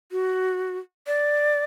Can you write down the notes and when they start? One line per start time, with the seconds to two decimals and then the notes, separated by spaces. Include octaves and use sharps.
0.12 F#4
1.07 D5